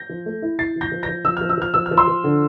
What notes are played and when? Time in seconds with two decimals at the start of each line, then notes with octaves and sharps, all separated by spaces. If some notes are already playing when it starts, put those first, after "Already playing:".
Already playing: G6 A#6
0.09 F3
0.26 A3
0.42 E4
0.59 E4 A6 C7
0.76 F3
0.81 G6 A#6
0.92 F3
1.03 G6 A#6
1.09 F3
1.25 F3 E6
1.37 F3 F6
1.49 E6
1.58 F3 F6
1.74 F3 E6
1.86 F6
1.91 F3
1.97 C6 E6
2.08 F3
2.24 D3